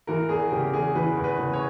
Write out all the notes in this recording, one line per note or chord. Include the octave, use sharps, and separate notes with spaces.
E3 A#4
E2 G#4
C#3 G4
E2 G#4
E3 B4
E2
B4
C#3
C#5